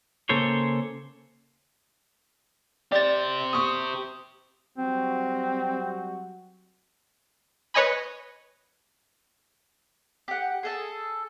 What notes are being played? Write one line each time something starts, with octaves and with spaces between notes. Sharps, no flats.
C#3 A#3 A4 C5 C#5
G4 C5 D5 A6
C#6 D#6
F#3 G3 C4 F#4
B4 C#5 D#5 G#5 B5
G4 F#5
G#4 A4 A5